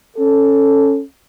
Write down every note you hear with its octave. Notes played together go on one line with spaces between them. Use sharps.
C#4 A4